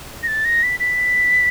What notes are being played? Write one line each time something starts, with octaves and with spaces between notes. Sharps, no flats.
A#6
A6
A#6
B6
B6